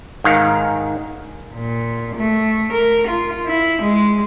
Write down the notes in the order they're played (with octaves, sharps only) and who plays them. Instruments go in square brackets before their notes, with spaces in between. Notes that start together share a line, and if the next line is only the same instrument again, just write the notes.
[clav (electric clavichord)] G#2 D#3 F5
[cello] A#2
A3
A#4
F4
E4
G#3